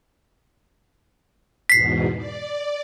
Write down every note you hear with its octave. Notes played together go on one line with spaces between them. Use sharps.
E2 G#2 B2 B6 C7
D5